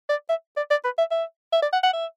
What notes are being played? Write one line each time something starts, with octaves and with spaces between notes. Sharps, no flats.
D5
E5
D5
D5
B4
E5
E5
E5
D5
F#5
F#5
E5